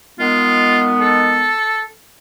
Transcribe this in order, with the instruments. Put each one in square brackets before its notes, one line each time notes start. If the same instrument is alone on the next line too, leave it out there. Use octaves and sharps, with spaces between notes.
[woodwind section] D#3 G#3 B3 [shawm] F4
[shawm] A4